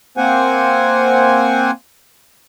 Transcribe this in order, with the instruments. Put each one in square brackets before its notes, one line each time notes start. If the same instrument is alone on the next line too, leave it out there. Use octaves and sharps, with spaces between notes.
[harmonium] A#3 C4 C5 F#5 G#5